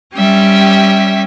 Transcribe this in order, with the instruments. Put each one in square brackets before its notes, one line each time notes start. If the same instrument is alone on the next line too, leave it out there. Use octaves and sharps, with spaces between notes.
[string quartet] G3 C#4 G4 E5